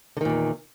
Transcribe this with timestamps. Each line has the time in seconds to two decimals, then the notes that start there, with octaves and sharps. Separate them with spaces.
0.17 D3
0.21 D#3
0.25 A#2
0.29 E2